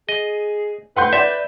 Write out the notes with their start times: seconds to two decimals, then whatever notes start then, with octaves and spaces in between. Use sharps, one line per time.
0.09 G#4 D#5
0.96 B4 F#5 C6 G6
1.13 D5 E5